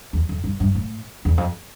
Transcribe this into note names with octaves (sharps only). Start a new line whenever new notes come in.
E2
F2
G2
G2
A2
E2
F2